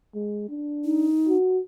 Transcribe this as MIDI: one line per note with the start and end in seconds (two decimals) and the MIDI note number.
0.15 0.45 56
0.49 1.09 62
0.85 1.36 63
1.28 1.60 66